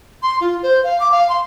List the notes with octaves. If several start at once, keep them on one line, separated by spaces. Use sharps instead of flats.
C6
F4
C5
F5
D6
F5
C6